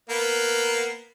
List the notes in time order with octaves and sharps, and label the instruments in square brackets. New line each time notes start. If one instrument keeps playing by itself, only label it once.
[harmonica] A#3 B3